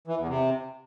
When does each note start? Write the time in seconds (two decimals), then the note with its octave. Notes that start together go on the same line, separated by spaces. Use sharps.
0.07 E3
0.18 E2
0.28 C3